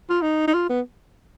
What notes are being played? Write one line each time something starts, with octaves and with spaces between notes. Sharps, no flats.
F4
D#4
D#4
F4
B3